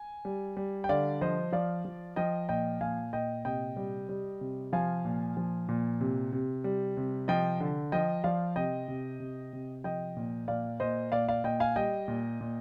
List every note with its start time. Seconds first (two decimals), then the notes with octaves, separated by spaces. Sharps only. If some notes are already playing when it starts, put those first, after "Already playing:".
Already playing: G#5
0.25 G3
0.57 G3
0.84 G5
0.89 D3 D5 F5
1.21 F3 C5 D#5
1.52 F3 D5 F5
1.85 F3
2.16 F3 D#5 G5
2.49 A#2 D#5 G5
2.81 A#2 F5 G#5
3.13 A#2 D#5 G5
3.45 C3 D#5 G5
3.76 G3
4.09 G3
4.41 C3
4.73 F3 F5 G#5
5.05 A#2
5.37 F3
5.69 A#2
6.00 C3
6.33 C3
6.64 G3
6.97 C3
7.28 F3 D#5 G5
7.60 D3
7.92 F3 D#5 G5
8.24 F3 D5 F5
8.56 C3 D#5 G5
8.88 C3
9.20 C3
9.53 C3
9.84 F3 D#5 G5
10.17 A#2
10.48 A#2 D5 F5
10.80 A#2 C5 D#5
11.12 A#2 D5 F5
11.28 D5 F5
11.44 A#2 D#5 G5
11.60 F5 G#5
11.76 G3 D#5 G5
12.08 A#2
12.41 A#2